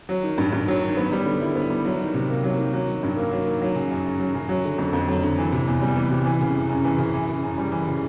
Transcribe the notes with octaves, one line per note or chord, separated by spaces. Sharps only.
F#3
D#3
G2
G2
F#3
D#3
B3
G3
D3
E4
B3
G3
F#3
D#3
C3
A#3
F#3
D#3
F#3
D#3
G2
A#3
F#3
D#3
F#3
C#3
F#2
F#2
F#3
C#3
F#3
D3
F2
F2
F#3
D3
E3
C3
E2
G3
E3
C3
E3
C#3
F#2
F#2
E3
C#3
E3
C#3
F#2
G3
E3
C#3